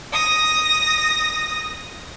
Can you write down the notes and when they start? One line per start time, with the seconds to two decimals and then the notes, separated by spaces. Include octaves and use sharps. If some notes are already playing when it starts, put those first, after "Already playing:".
0.12 D#6 A#6